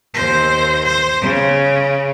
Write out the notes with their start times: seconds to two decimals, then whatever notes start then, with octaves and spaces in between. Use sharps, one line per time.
0.14 D#2 C5
0.85 C5
1.21 C#3